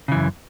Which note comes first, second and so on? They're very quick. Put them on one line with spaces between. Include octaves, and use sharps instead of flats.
C#3 E3 F#2